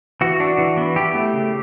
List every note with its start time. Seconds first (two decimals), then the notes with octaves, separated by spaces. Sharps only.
0.21 E3 F#4
0.40 D4
0.58 E3
0.77 B3
0.96 E4 G4
1.15 A3
1.33 C#3